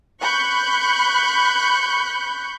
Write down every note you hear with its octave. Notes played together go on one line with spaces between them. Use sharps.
B5 C#6 F#6 G6